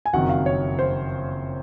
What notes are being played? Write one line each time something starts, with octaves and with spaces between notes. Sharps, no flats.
G#5
F#1 F2 D#3 F#3 F#5
F5
C#5
C5